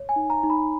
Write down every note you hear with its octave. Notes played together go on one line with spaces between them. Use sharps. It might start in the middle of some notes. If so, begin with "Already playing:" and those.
Already playing: C#5
G#5
D#4
A#5
D#4
B5